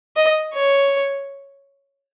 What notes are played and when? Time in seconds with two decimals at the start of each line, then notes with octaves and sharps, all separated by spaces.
0.16 D#5
0.54 C#5